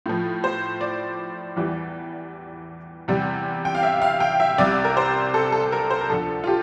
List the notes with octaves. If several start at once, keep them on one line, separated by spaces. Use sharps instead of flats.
A2 F3
C5
D5
E2 E3 G3
E2 C3 G3
G5
F5
E5
F5
G5
E5
C2 C3 G3 D5
A#4
C5
A4
A4
A4
A#4
C5
A#4
D2 D3 F3 A4
F4
G4